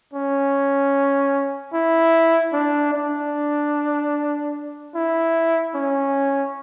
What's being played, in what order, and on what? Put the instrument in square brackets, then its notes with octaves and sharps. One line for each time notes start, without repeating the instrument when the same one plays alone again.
[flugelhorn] C#4
E4
D4
D4
E4
C#4